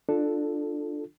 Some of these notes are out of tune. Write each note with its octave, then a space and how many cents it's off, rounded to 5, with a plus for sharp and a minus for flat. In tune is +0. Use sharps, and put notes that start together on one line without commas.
D4 +15 F4 +0 A4 +0